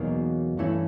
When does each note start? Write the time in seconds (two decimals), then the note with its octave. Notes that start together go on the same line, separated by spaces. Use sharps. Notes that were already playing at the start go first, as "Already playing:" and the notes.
Already playing: E2 B2 F#3 A#3 D#4
0.57 G2 E3 A3 C#4 E4